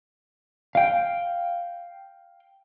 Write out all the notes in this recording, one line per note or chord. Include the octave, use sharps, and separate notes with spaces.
F5 G5